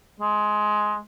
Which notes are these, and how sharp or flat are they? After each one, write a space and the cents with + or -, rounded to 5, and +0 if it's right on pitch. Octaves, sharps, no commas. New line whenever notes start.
G#3 +15